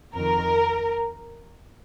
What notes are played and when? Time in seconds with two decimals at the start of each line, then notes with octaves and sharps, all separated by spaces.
0.14 F2 D#3 A#4